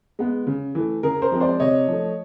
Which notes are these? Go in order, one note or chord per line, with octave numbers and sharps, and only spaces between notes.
G#3 B3
C#3
E3 A3
C#3 G#4 A#4
A#4 C5
F3 G#3 C4
C5 D5
C3 C#5 D#5
F3 A3